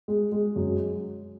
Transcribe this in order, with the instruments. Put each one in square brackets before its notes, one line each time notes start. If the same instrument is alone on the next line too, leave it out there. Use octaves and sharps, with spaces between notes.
[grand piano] G#3
G#3
F#2